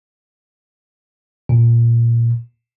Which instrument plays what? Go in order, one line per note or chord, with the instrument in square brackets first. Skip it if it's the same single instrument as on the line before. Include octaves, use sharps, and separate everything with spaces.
[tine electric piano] A#2